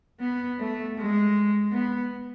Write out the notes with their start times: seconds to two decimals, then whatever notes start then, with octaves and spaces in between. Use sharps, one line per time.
0.20 B3
0.59 A3
0.97 G#3
1.72 B3